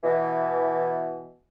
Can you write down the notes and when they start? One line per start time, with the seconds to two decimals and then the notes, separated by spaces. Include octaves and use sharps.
0.04 B2 E3